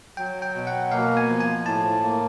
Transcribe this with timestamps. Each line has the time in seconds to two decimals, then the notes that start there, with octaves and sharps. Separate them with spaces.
0.17 F#3 G5
0.42 G5
0.55 B2
0.67 F#5
0.92 A#3 F5
1.17 G#5
1.29 F3
1.40 G#5
1.66 A2 A5
2.03 A#3